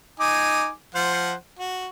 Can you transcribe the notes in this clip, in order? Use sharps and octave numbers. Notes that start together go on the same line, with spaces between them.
D#4 G#5 D6
F3 C5 F#5
F#4